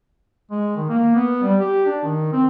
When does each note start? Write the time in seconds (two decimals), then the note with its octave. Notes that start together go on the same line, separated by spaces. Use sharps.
0.51 G#3
0.77 D#3
0.89 A#3
1.16 B3
1.43 G3
1.59 G4
1.86 D4
2.04 D#3
2.33 C4